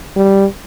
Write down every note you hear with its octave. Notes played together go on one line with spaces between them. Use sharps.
G3